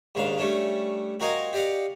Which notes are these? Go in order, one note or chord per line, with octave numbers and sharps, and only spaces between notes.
D#2 G#2 C#3 D4 F5
G3 A3 C#4 D4
C4 F#4 A#4 D#5 F5 G#5
G4 D5 D#5 F5 F#5